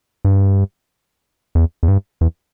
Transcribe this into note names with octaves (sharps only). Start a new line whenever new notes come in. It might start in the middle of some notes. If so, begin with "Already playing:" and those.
G2
E2
E2
G2
E2